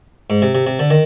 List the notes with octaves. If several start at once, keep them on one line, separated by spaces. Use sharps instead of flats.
G#2
C3
C3
C3
D3
D#3